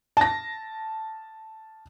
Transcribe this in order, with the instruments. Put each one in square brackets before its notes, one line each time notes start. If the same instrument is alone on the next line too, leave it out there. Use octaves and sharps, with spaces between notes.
[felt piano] A5 A#6